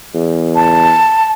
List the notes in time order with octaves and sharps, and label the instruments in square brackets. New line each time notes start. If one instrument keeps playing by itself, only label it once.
[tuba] E2
[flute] A5